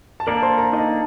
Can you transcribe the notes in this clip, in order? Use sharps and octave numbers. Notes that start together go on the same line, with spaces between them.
A5
A#3 D4 A4 A#4 D5 A#5
C5 C6
A#4 A#5
D#4 D#5